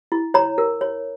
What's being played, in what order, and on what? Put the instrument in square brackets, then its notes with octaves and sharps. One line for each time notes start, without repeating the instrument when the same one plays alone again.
[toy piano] E4
C#5 A#5
A#4
C#5